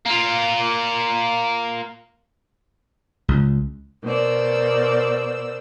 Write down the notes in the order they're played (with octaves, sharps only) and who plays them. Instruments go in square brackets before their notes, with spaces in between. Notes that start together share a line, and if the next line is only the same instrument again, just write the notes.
[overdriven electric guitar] A#3 F4
[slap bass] C#2
[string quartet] B2 A#4 C5 D5 E6